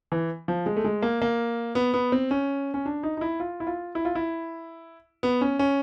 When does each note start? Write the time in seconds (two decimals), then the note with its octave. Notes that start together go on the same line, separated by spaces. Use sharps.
0.12 E3
0.48 F3
0.66 G#3
0.76 A3
0.84 G#3
1.02 A#3
1.22 A#3
1.75 B3
1.94 B3
2.12 C4
2.31 C#4
2.74 C#4
2.85 D4
3.03 D#4
3.17 D#4
3.21 E4
3.40 F4
3.60 E4
3.67 F4
3.95 E4
4.05 F4
4.15 E4
5.23 B3
5.41 C#4
5.59 C#4